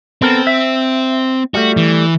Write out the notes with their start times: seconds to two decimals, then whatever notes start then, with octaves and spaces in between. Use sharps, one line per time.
0.22 B3 C4 A4 A#4
0.47 E5
1.54 G3 A3 F#4
1.77 E3